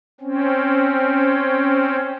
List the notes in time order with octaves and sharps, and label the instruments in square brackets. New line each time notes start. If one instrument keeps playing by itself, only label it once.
[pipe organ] C4 C#4